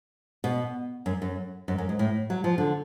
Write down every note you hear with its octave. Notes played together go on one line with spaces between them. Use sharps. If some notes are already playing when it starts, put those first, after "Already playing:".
B2
F#2
F#2
F#2
F#2
G#2
A2
F#3
F3
D3